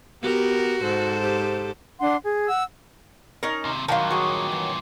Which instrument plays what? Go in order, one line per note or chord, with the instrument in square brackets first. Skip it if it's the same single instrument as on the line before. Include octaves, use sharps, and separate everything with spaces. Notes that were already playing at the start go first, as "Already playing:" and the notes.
[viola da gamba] B3 G4 A#4 [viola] F#4
[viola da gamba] G#2 A4 C5
[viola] G4
[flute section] D4 F#5 C6
G#4
F#5 E6
[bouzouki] C#4 D#4 A#4
[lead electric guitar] D#2 C3
[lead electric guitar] G2 A#2 [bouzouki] D#3 F#3 [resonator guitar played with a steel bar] F5 F#5 A5
[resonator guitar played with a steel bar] F#4 G#4
E3